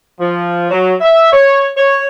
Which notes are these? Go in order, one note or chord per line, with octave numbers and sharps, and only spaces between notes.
F3
F#3
E5
C#5
C#5